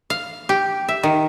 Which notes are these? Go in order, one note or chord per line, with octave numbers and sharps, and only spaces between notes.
F5
G4
E5
D#3